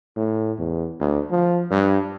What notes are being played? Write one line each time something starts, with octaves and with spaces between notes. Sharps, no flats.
A2
E2
D2
F3
G2